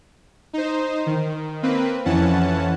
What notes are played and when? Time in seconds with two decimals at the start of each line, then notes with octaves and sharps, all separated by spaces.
0.53 D#4 C5
1.06 D#3
1.63 A#3 C4 B4
2.05 F2 E3 C#4 F#5 A5